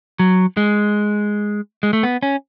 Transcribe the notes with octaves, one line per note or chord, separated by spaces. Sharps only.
F#3
G#3
G#3
A3
B3
C#4